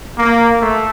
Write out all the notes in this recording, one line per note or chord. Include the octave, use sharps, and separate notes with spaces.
A#3
A3